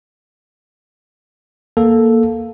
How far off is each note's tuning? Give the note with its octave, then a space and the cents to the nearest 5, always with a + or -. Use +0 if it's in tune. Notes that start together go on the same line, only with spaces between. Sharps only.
A#3 +0 A4 -5